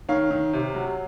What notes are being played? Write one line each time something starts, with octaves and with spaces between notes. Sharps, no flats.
D#3 C#5 F5
D#3
C3
F#3